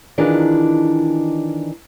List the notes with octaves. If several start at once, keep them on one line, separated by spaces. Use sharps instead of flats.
D#3 E3 D4 D#4 F4 G#4